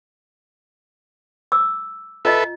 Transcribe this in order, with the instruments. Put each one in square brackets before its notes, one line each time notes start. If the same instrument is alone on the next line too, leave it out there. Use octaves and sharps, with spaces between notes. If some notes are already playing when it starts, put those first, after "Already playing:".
[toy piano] D6 E6
[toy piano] F4 D#5 [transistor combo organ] A4 B4 E5